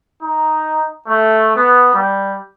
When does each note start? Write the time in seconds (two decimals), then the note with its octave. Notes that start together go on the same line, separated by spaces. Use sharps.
0.21 D#4
1.07 A3
1.56 B3
1.93 G3